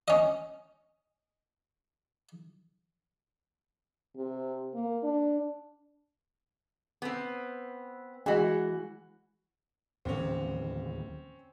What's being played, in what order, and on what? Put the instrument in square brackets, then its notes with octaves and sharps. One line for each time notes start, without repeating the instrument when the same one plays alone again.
[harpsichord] C#4 D#5
[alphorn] C3
A#3
D4
[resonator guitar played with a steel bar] B3 C4
[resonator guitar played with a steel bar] E3 F#4 [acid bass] G#3
[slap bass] D1 D#2 E3 [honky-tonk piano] C4 C#4